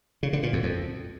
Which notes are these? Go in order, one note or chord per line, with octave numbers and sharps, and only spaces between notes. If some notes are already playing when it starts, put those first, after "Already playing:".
C#3
D3
A#2
F2
F2